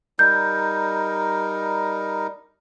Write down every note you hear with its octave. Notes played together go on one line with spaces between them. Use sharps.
G3 D#4 A#4 G6